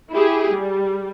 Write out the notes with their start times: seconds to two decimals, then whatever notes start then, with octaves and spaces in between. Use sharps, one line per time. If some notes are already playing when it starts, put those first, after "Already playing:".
0.14 E4 G4 G#4
0.54 G3